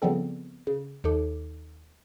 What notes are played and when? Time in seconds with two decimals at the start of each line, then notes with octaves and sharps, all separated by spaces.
0.02 C#3 F3 G3 B3 C4 A4
0.67 C#3
1.04 D#2 D#4 A4 D6